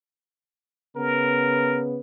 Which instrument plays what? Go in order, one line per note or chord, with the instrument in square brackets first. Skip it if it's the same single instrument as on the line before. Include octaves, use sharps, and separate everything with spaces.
[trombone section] C#3 B3 [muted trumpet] A#4